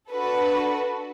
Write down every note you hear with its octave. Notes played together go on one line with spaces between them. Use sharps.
D4 F#4 A4 B4